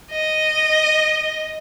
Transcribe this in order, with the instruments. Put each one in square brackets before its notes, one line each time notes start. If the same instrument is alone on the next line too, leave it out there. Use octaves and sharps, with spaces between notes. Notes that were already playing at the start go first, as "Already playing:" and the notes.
[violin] D#5